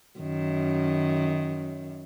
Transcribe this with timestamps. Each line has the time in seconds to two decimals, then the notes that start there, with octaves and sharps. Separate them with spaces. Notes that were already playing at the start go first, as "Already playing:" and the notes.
0.20 F#2 D#3